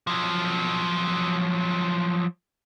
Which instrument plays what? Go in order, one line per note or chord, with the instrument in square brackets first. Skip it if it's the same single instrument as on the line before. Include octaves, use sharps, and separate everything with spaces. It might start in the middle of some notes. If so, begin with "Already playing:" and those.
[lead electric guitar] F3 F#3